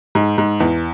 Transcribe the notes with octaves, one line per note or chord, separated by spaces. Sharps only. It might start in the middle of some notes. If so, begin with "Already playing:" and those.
G#2
G#2
E2